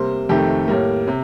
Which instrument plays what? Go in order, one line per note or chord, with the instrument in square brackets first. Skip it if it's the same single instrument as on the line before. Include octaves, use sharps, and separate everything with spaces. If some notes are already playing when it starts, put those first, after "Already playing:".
Already playing: [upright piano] C3 G3 A#3 C5
F2 C3 D#3 A3 G4
A2 G3 A#3
C3